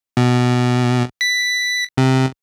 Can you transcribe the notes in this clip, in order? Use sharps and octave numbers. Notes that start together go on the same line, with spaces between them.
B2
B6
C3